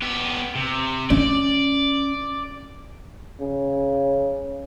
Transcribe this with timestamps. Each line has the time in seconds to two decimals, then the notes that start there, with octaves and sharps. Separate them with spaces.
0.02 B3 G4
0.55 C3
1.10 C#4 D5
3.41 C#3